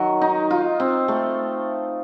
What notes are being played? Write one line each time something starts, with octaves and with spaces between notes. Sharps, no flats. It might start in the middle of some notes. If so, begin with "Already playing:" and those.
Already playing: D#3 F#3
D#4
F4
C4
A3